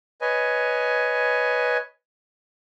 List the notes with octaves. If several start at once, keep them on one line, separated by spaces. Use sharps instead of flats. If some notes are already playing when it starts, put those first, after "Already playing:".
B4 C#5 D#5 G#5